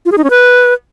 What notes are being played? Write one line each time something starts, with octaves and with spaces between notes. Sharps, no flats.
F4
G#4
D#4
C#4
B4